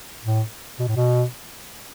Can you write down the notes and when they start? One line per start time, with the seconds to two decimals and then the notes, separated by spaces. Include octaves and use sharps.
0.25 A2
0.79 B2
0.88 A2
0.96 B2